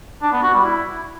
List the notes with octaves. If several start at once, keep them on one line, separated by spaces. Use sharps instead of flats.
D4
B3
F#4
G3
E4